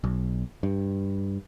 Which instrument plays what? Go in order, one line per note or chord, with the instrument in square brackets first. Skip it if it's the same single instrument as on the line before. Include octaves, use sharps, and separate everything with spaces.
[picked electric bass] B1
G2